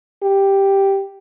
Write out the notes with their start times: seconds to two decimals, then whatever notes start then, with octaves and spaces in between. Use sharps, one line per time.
0.23 G4